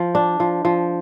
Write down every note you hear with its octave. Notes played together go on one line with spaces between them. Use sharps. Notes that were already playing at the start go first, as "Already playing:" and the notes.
Already playing: F3
D4
F3
F3